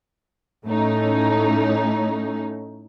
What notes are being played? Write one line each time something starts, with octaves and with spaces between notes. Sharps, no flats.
A2 A3 C#4 D#4